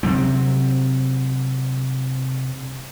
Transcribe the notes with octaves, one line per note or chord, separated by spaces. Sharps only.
C3 F#3 C4